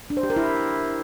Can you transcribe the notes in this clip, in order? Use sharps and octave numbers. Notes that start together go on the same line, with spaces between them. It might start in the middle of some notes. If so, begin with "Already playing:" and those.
D4
C5
G4
A#4
E4